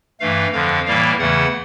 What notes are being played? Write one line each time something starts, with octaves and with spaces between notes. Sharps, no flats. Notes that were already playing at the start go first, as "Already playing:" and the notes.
G2 E3 A3 F5
F2 D3 F3 F5
A2 E3 G3 A#3 F5
E2 C#3 E3 A3 F#5